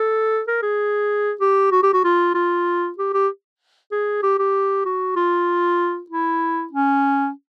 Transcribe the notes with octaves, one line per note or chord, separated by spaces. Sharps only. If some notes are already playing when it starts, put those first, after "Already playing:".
Already playing: A4
A#4
G#4
G4
F#4
G4
F#4
F4
F4
G4
G4
G#4
G4
G4
F#4
F4
E4
C#4